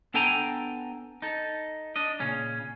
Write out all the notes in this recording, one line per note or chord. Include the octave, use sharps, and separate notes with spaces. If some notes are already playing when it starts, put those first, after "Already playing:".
B3 D4 A4 G5 G#5 A#5
D#4 A4
D4 D#5
A#2 C#3 C#4